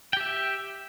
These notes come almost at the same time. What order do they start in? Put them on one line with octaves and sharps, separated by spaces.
G5 G4 E5